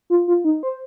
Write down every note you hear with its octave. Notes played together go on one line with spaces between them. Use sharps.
F4
F4
D#4
C5